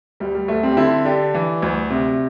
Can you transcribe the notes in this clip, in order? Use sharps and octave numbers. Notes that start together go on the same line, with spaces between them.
D2 G3
G3
D2 A3
G3 C4
G4
D3 C4 E4
D3 D4 G4
E3
D2
C3